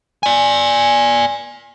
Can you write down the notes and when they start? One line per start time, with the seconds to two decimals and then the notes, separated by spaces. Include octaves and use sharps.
0.23 D5 G#5